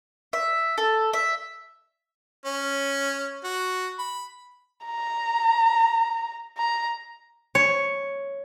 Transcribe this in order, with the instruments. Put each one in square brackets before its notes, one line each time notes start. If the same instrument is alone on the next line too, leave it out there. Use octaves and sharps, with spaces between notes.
[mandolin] E5
A4
E5
[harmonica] C#4
F#4
B5
[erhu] A#5
A#5
[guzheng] C#5